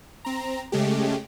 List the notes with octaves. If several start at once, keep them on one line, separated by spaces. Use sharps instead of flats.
C4 A#5
C#3 G#3 A3 G4